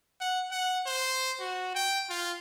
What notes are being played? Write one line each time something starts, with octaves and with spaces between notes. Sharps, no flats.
F#5
F#5
C5
F#4
G5
F4